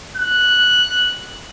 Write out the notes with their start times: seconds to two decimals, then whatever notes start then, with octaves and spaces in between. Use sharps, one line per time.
0.17 F#6